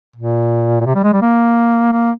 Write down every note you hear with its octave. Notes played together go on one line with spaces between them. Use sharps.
A#2
A#2
C3
G3
G#3
G3
A#3
A#3